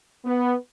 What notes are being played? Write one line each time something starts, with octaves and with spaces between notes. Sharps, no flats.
B3